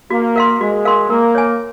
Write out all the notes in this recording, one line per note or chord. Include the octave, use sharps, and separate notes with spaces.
A#3 F#4
A#4 F5 C6
G#3 F#4
A#4 F5 C6
A#3 A#4
C#5 G#5